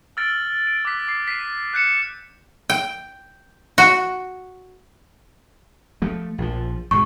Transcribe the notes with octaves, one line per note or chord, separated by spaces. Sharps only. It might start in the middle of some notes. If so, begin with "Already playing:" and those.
E6 F6 A6 D7
D7
D6 F#6 B6
D6 A6 C7
B6 C7 D#7
F#6 G6 C#7 E7
G5
F#4
F3 A3
A#1 F3
D2 G#2 B2 C#6